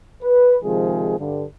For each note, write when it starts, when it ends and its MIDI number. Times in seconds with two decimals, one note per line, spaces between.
0.23 0.58 71
0.64 1.17 48
0.64 1.17 51
0.64 1.17 53
0.64 1.17 56
0.64 1.17 68
1.19 1.44 43
1.19 1.44 50